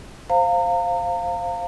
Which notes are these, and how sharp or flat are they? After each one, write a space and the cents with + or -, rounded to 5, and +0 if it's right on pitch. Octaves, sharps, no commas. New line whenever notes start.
C5 +0 F5 +0 A#5 -35